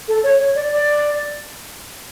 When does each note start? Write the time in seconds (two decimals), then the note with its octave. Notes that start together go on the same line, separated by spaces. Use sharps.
0.08 A4
0.24 C#5
0.39 C#5
0.55 D5
0.71 D5